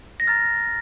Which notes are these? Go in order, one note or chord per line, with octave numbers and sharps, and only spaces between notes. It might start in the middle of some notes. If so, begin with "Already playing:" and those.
A#6
A#5 F6 A6